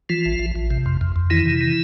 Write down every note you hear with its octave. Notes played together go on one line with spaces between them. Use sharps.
E3 F3 F4
A1
A1
A1
C3
F2
F2
F2
D#3 E3 E4
C3
D#3